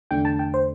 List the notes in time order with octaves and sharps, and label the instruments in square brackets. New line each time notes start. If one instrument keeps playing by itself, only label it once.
[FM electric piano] E2 D3 A3 D4 G5
A5
G5
C5